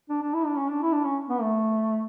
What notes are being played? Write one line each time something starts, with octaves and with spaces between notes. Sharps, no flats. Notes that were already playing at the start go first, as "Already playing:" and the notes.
D4
D4
E4
D4
C#4
D4
E4
D4
C#4
B3
A3